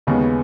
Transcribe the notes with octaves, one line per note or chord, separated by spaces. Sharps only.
D#2 C#3 G#3 B3